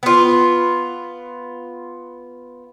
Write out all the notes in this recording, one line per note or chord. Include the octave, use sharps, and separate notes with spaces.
B3 F4